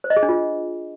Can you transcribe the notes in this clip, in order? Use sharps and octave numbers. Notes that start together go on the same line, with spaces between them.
C5
D#5
G#4
D4
F4